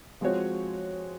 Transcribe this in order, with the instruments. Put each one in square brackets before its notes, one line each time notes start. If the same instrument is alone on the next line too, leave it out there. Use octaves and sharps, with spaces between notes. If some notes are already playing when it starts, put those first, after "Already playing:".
[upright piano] F3 G#3 C4 F#4 C#5